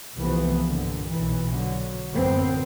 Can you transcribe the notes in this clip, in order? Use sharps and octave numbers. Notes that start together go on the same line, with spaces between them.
C2 E3 F3 A3 B3
G2 A#2 D3
B1 E3
D3 F#3
A1 F#2 D3 B3 C4